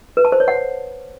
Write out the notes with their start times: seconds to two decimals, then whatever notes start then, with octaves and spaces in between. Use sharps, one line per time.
0.17 B4
0.25 A5
0.32 C5
0.40 C#5
0.48 F#5